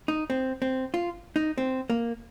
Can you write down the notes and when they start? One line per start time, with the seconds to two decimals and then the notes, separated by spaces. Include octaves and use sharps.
0.08 D#4
0.30 C4
0.62 C4
0.94 F4
1.36 D#4
1.58 C4
1.90 A#3